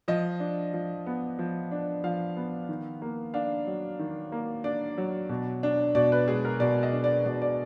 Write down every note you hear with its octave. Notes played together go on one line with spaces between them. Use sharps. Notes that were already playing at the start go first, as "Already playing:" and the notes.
F3 D#5
D4
F3
B3
F3
D4
F3 F5
B3
D#3
A#3
D4 F5
F#3
D#3
A#3
D4 D5
F#3
B2
D4
B2 D5
B4
G#3 G#4
A#4
B2 D5
D#5
D4
D5
B2 D5
D5